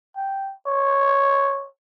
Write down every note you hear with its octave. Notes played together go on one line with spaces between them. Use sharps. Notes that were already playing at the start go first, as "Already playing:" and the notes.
G5
C#5